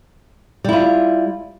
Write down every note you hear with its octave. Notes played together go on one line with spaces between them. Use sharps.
G3 E4 F4